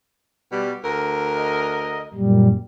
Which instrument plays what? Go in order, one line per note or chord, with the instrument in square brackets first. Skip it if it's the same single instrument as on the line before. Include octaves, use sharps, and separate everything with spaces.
[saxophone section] B2 G3
D2 A#4
[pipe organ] D#5
F#2 A#2 G3